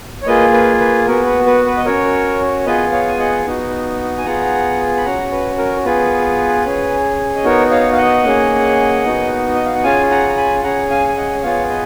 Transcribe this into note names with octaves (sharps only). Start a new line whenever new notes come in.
C#5
A#3 F4 G#4 B4 D#5
B4
B4
B3 F#4 A#4
B4
B4
B4
D#5
C#4 F#4 A#4 C#5
B3 F4 G#4 B4 D#5
C#5 F5
G#5
D#5 F#5
B3 D#4 F#4
G#5
B3 F4 G#4 F#5 A#5
B5
C#4 F#4 F#5 A#5
B4
A#4
B3 F4 G#4 B4
C#4 G#4
D#5
B3 D#4 F#4 A#4 C#5
C#5 F5
F5
D#5 F#5
A#3 C#4 G#4
B3 D#4 F#4
D#5
F5
F#5
C#4 F4 G#4 F5 G#5
F#5 A#5
A#5
G#5 B5
C#4 G#4 F#5 A#5
F5 G#5
G#5
D#5 F#5
B3 F4 G#4 C#5 F5
B4 D#5